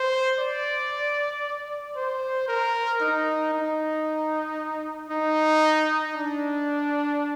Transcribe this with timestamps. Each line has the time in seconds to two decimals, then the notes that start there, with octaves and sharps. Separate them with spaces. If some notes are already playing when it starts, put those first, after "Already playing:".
Already playing: C5
0.40 D5
1.96 C5
2.48 A#4
3.01 D#4
3.53 D#4
5.10 D#4
6.15 D4